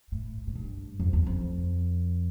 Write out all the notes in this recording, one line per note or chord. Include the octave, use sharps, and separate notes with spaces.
A2
A2
G2
F2
E2
F2